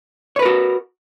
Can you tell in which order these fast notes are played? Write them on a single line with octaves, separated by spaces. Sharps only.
C#5 B4 A#4 F#4